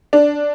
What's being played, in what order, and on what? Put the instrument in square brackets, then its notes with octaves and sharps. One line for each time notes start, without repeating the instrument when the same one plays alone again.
[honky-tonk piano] D4